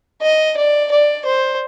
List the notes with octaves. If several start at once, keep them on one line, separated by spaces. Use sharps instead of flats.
D#5
D5
D5
C5